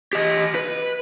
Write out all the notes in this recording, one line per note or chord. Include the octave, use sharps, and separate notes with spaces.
G4 D#5
B4